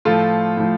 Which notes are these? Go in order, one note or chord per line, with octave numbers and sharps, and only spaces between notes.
A2 F3 F4 A4
A2 F3